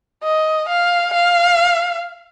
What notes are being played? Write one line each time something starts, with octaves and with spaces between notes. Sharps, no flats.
D#5
F5
F5